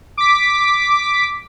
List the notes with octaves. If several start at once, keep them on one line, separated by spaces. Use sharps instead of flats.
D6 B6